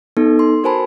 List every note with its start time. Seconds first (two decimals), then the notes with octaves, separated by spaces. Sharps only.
0.17 B3 D#4 A4
0.39 C6
0.64 F#4 A#4 C5 G#5 A5 B5